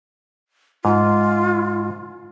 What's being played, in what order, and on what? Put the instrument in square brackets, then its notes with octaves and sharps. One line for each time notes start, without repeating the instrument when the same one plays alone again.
[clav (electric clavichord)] G#2 [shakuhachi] F4